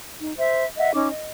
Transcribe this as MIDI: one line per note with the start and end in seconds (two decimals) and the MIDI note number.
0.20 0.36 63
0.36 0.64 72
0.36 0.64 76
0.77 0.93 75
0.77 0.93 76
0.77 0.93 78
0.93 1.07 61
0.93 1.07 63
0.93 1.07 86
1.10 1.32 75